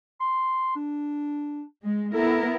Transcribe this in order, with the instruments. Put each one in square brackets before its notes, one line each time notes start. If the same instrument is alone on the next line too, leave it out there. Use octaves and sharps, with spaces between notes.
[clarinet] C6
D4
[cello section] G#3
[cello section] B3 E4 A#4 [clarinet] A4